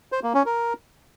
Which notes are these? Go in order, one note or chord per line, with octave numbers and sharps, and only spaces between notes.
C5
A#3
C#4
A#4